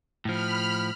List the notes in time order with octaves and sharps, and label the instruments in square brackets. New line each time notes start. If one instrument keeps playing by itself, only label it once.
[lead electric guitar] A2 F3 [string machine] B5 F6